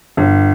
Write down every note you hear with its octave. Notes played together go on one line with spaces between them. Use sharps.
G1